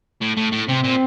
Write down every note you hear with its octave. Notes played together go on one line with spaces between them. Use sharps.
A2
A2
A2
C3 C4
A#2